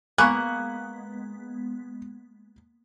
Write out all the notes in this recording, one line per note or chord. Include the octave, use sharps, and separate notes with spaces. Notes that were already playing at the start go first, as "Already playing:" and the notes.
G#3 A#3 B3 G#5 B5 C#6 F#6